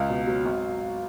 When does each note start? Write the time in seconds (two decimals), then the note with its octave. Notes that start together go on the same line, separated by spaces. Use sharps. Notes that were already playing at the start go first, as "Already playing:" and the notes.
Already playing: C#2 F5
0.09 B2
0.27 F#3
0.45 G#1